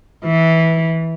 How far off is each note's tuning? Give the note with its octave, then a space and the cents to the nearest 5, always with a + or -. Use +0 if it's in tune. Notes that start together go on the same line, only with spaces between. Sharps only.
E3 -10